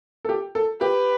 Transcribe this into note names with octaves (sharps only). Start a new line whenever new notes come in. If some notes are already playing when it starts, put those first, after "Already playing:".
A4
G4
A4
G4 B4